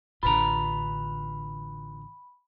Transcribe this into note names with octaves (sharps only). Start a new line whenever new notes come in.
A1 D3 F4 B4 A#5 B5